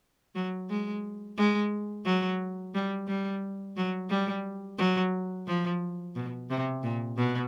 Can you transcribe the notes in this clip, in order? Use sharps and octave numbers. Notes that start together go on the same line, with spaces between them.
F#3
G#3
G#3
F#3
G3
G3
F#3
G3
F#3
F3
B2
C3
A#2
B2